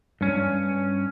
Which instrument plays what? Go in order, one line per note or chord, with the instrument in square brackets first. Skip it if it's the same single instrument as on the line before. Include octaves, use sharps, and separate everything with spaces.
[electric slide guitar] G2 C#4